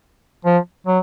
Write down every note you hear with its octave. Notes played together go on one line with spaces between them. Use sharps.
F3
F#3